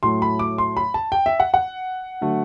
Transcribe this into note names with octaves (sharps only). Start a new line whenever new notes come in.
A2 F#3 A3 C6
B5
D6
C6
B5
A5
G5
E5
F#5
F#5
D3 F#3 A3